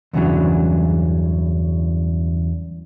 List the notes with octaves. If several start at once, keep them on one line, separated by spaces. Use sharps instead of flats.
E2 G2 C#3 E3 F#3 D4